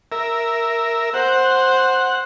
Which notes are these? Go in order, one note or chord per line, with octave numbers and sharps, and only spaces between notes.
A#4 E5
C5 F#5